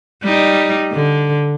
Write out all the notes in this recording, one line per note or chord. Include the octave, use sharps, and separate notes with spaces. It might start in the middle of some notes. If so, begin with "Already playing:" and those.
G3 D#4
D3